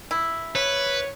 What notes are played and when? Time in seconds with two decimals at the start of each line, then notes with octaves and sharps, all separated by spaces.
0.11 E4
0.55 B4 C#5